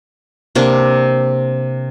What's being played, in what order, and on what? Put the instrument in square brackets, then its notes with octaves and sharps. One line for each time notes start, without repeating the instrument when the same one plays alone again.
[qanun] C3 A#3 D4